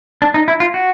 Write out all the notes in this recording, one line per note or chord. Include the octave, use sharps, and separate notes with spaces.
D4
D#4
E4
F4
F#4